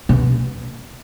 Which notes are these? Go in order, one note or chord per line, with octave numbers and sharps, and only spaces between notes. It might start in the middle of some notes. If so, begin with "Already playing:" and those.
B2